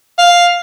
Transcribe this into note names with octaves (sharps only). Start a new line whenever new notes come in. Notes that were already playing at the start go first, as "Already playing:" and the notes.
F5